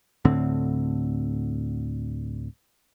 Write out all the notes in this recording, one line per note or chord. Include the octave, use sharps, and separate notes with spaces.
D2 A2 D3 C4